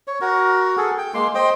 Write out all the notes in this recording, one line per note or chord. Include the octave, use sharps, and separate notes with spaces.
C#5
F#4 A#4
G#4 A4
G5
G#3 A#3 C6
C5 D#5 G5